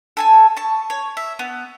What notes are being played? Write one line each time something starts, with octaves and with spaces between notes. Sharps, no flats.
A4 G#5 A5
A5 C#6
C#5
E5
B3